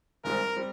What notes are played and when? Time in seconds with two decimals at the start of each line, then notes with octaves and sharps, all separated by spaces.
0.24 G#1 G#2 G3 C4 A#4
0.56 G3 C4